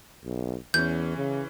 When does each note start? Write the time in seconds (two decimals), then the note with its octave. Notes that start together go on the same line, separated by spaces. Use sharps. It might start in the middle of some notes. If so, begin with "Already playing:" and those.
0.25 B1
0.74 E2 E3 C#4 G6
1.16 C#3